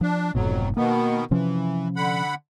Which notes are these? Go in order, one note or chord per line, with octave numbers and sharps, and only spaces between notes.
F3 D4
F1 F2 G#2 B2 F#3
B2 D#3 A#3 B3
C3 E3 F3 C#4
D3 F#5 B5